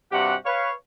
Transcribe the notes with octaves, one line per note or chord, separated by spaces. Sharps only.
G2 C3 F#4 G4 F#5
B4 C#5 F5